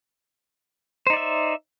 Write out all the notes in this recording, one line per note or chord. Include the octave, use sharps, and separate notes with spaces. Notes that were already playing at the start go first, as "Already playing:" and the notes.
D#4 C5 D5 E5